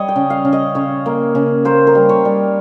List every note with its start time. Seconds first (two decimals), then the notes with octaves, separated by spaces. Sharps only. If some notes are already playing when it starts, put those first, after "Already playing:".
Already playing: G3 C#5 D#5
0.09 G5
0.16 C#3
0.30 F5
0.45 C#3
0.53 D#5
0.75 C#3 C#5
1.06 A#3
1.35 C#3
1.65 A#3 C5
1.87 A#4
1.95 G3
2.09 C#5
2.25 G3